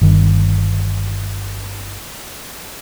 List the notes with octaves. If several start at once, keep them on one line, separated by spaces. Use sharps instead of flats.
G1 D#3